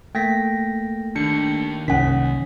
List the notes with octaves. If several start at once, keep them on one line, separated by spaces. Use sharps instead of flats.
A3 A#3 G5 A#6 B6
D#2 D4 C#7
C2 F#2 C#4 F#5 B6